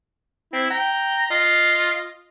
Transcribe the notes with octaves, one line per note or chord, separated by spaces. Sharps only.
C4 E4
G5 A#5
F4 D#5